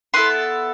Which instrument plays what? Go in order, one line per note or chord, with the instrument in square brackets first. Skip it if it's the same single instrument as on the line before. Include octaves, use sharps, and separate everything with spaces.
[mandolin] B3 E4 A4 C6